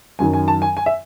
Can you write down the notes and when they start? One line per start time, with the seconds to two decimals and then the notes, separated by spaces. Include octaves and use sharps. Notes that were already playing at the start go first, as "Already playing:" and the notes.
0.19 F#2 D#3 F#3 G#5
0.33 G#5
0.48 A5
0.62 G#5
0.77 G#5
0.86 E5